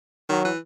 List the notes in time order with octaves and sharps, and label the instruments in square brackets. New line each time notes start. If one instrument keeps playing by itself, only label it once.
[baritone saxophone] D#3 [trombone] F#3
[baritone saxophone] E3